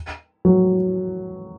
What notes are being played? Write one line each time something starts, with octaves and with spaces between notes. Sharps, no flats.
F#3